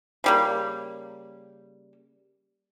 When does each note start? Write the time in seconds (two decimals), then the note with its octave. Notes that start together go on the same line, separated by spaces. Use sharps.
0.24 C#3 G3 A#3